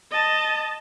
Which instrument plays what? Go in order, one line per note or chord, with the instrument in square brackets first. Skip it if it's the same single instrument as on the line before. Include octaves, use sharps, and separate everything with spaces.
[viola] D#5 A5